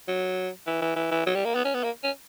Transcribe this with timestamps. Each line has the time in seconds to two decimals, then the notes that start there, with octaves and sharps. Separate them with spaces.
0.08 F#3
0.67 E3
0.82 E3
0.96 E3
1.11 E3
1.26 F#3
1.35 G3
1.45 A#3
1.55 B3
1.65 C#4
1.74 B3
1.84 A#3
2.04 C#4